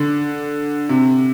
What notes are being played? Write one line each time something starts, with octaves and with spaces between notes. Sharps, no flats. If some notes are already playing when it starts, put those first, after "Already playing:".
Already playing: D3
C3